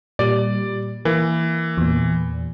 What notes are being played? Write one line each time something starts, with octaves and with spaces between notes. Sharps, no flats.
A#2 G3 D5
E3 A#3
E2 A#2